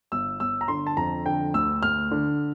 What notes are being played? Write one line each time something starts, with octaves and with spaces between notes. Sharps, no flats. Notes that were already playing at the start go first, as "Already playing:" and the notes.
G1 E6
G1 E6
A#5
D3 C6
A5
F2 A#5
D3 G5
D2 E6
D2 F6
D3